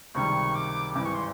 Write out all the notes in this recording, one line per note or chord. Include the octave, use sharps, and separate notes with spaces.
C#2 C3 D#3 G3 C#6
D6
G#1 G2 E3 D6
C#6
C6